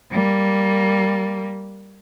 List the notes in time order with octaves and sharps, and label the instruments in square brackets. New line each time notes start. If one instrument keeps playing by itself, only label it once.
[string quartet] G3 A#3